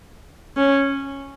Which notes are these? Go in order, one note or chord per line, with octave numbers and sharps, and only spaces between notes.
C#4